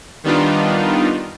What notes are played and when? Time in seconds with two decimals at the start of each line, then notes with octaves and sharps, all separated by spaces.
0.24 D#3 G3 B3 D4 D#4 F4